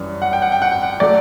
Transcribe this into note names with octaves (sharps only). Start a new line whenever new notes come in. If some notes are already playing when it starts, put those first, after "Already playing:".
Already playing: F#2 E3 G3
F#5
G5
F#5
G5
F#5
G5
F#5
F#3 A3 D5